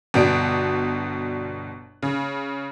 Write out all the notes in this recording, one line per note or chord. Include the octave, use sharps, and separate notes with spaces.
G1 B2 D4 D7
C#3